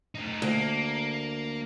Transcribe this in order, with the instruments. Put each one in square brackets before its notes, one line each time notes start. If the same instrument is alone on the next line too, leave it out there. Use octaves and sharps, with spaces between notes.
[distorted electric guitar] A3 D#4
[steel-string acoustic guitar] D2 [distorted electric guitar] A#3